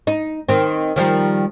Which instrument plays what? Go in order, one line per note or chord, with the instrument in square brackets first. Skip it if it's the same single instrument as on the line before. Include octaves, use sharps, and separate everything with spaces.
[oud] D#4
D#3 C4
D#3 F3 G3